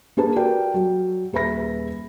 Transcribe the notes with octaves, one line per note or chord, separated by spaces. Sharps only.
A#3 D4 G#4 B4 A5
F#4 G4 A#4 D5 G5
F#3
D#1 G#4 B4 E5 B5 A#6